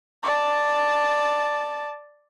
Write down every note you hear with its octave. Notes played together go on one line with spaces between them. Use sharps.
D5 A5